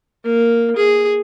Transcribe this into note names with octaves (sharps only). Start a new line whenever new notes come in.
A#3
G#4